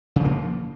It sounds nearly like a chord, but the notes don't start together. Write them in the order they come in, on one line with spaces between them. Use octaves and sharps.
C#3 F3 A#3